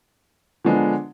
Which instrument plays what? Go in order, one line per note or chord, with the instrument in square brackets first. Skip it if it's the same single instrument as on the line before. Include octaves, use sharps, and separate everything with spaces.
[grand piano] D3 F3 G#3 B3 D4